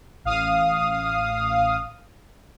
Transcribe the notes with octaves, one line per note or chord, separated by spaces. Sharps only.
A1 F5 D#6